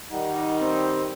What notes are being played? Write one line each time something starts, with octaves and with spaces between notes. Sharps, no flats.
D#3 G3 D#4 F#5
C4